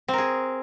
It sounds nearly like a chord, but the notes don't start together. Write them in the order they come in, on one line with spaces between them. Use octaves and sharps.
C4 A#4 G#4